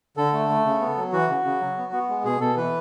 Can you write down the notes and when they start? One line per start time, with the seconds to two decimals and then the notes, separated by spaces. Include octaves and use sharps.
0.17 D3 A4
0.33 A3
0.49 A3
0.65 C#3
0.80 B3
0.97 F#3
1.13 E3 F#4
1.29 C#3
1.44 C#3
1.61 F#3
1.77 B3
1.93 B3
2.09 G#3
2.25 B2 G#4
2.41 B2 A4
2.56 E3 B4